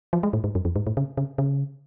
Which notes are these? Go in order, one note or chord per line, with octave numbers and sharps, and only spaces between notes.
F3
G#3
A2
G#2
F#2
F2
G#2
A2
C#3
C#3
C#3